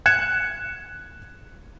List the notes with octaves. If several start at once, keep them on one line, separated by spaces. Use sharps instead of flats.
F#6 G#6 C#7 E7